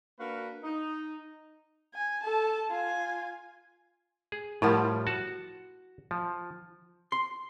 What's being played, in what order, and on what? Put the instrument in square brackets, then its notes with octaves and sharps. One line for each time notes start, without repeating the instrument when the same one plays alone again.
[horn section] A#3 D4 F#4 A#4 B4
D#4
[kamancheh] G#5
A4 A5
F4 G#5
[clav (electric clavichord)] G#4
[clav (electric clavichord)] A2 F3 G3 [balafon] E4 A#4 F#5
[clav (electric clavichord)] F#4 A5
F3
[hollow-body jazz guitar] C6